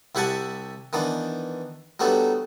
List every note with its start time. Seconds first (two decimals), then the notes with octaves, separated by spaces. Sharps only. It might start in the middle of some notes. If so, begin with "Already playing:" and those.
0.15 C2 E4 G4 F#5 G#5 A5
0.93 D#3 E3 B3 D4
2.00 F#3 G3 A3 B3 D4